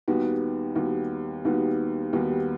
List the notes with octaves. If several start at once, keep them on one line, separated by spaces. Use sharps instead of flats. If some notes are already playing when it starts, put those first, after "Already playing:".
D#2 D#3 G3 B3 F#4
D#2 D#3 G3 B3 F#4
D#2 D#3 G3 B3 F#4
D#2 D#3 G3 B3 F#4